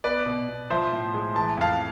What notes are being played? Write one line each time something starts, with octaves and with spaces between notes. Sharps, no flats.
B3 B4 D5
B2
B2
F3 C5 E5
A2
G#3
E3 A5
F2 F5 A5